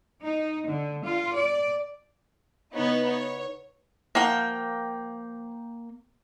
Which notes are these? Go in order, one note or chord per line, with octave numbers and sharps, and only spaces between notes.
D#4
D3
F4
D5
C#3 B3 D#4 E4 B4 C#5
C#5
F3 A#3 A#4 F#5 G5